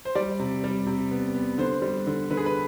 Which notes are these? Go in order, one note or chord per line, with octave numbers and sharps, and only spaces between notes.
C5
G3 D5
C3
G3
C3
B3
B3
D3 C5
G3
D3
D3 B4
G#4
B4